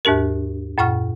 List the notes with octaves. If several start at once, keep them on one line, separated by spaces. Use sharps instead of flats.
D#2 G#2 D4 G4 A#4
F#2 A#2 F#5 C#6 F6